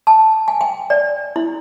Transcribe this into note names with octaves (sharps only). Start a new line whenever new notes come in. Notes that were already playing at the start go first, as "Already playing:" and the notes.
A5
G#5
G5
D5
E4